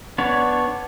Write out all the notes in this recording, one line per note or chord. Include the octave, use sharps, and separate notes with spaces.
B3 D4 C#5 D5